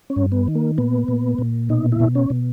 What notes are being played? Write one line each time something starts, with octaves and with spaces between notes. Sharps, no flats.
C#4
G2
B3
D#3
A#3
A#2 B3
A#2
A#2
B2 D#4
E4
B2
C#4
B2